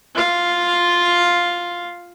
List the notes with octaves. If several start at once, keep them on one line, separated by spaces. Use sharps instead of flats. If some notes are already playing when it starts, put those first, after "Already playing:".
F4 F5